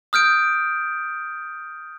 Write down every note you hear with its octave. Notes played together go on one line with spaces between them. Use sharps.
D#6 F6 G6 D7